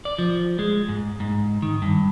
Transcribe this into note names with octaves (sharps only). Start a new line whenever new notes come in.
D5
F3
G#3
G#2
G#2
D#3
G2